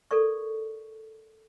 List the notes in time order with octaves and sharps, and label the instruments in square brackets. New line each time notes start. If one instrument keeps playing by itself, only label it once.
[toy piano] A4 A#4 D5 C#6